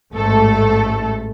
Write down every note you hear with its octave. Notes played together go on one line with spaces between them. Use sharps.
A1 G#2 A3 A4